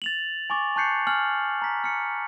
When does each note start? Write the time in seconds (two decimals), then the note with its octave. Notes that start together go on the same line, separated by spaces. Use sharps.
0.02 A6 F7 F#7
0.50 G#5 C#6 D6 A6
0.76 A5 C#6 F#6 G6 C7 C#7
1.07 G#5 F6 F#7
1.62 A#5 B6
1.84 F6 C#7